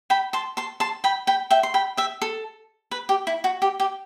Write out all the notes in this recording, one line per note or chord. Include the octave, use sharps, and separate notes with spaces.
G5 B5
A5 C6
A5 C6
A5 C6
G5 B5
G5 B5
E5 G5
C6
G5 B5
E5 G5
A4
B4
G4
E4
F#4
G4
G4